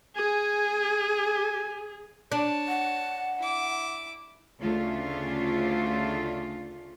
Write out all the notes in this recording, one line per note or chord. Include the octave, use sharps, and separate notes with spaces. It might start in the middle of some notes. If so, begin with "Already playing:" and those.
G#4 G#5
D4 C#5 A5
F#5
E4 D6
D2 C#3 A3 C#4 D4 F4